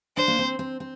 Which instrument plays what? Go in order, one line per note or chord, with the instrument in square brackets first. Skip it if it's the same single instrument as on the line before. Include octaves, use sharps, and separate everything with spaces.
[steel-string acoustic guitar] D4 [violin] C5
[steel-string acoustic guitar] A#3
C4
C4
C4